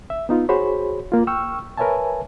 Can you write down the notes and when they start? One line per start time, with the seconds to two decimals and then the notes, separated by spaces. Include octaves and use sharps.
0.10 E5
0.29 B3 D#4 F4
0.49 F#4 G#4 C5 C#5 B5
1.12 A#3 F4
1.27 G5 C#6 E6 F6
1.78 A#4 B4 C#5 E5 G#5 A5